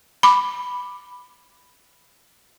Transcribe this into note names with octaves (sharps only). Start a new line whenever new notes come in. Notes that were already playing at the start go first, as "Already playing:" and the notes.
B5 D6